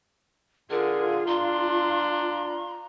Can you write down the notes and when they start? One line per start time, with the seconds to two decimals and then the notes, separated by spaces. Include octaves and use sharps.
0.70 D3 F4 G#4 A#4
1.28 D4 A#5 C6